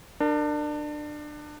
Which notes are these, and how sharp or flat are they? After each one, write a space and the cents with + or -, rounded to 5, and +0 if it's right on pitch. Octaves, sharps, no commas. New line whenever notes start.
D4 +25 A#4 -15